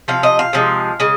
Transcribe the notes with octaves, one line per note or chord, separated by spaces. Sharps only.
C3 F3 F5
D#5
F5
C3 F3 G#3
C#3 G#3